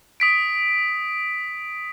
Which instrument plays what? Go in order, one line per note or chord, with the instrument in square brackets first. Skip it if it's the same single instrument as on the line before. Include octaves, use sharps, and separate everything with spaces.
[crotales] D#6 B6 D7